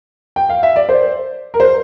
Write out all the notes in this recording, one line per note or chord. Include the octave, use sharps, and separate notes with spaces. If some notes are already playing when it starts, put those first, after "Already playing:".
G5
F5
E5
D5
C5
A#4
C5